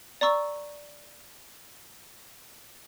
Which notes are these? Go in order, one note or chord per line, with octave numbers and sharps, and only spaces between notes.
D5 A#5 C#6 E6